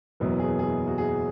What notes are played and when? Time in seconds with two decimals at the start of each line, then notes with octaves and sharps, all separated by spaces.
0.20 F#1 E2 B2 F#3 E4
0.39 G#4
0.59 G#4
0.88 F#4
0.98 G#4